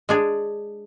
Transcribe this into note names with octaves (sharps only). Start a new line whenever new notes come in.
G#3 D4 G#4